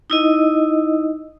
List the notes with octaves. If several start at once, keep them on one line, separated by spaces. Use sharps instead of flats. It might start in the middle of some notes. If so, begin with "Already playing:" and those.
D#4 E4 D#5